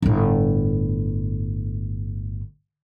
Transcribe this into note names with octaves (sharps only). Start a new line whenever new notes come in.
G1 A2